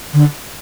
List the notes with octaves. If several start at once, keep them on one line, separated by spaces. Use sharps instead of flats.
D3